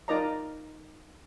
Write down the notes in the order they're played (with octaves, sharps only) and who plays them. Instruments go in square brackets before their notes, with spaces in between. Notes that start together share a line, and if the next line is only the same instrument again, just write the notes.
[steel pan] D#4 F4 A#4 D5 D#5 A#5